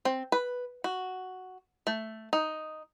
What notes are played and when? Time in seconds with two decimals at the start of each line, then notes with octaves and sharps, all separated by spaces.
0.05 C4
0.32 B4
0.84 F#4
1.87 A3
2.33 D#4